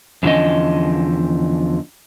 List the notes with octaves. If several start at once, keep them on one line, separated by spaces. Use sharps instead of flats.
E2 D3 E3 F3 C#4 D#5